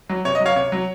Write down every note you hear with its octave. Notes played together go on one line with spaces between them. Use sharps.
F#3
C3 C#5
D#5
F#3
C#5 F5
C3 C#5
F#3